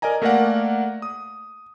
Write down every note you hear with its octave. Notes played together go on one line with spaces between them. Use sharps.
A#4 D5 D#5 G#5 A#5
A3 A#3 A#4 D5 F5 F#5
D#6